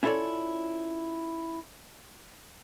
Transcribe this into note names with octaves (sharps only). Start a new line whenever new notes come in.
C#4 E4 F4 A4 C#5 D5